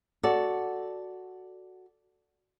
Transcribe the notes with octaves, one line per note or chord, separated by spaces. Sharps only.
F#4 A4 D5